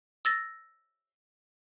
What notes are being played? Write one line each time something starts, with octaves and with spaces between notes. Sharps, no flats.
E6 A6 A#6